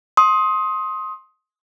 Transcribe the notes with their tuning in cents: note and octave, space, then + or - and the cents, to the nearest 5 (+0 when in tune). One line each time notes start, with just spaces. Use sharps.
C6 +20 D#6 +20